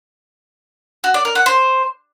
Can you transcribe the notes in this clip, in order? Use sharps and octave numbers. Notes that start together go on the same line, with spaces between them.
F#4
D5
A#4
F#5
C5